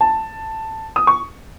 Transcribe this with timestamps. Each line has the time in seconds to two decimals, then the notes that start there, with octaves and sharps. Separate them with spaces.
0.01 A5
0.96 D#6
1.07 C#6